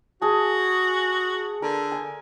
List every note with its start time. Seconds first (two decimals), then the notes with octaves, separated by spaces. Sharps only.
0.22 F#4 G#4 A5
1.62 D3 A#4
1.92 G#5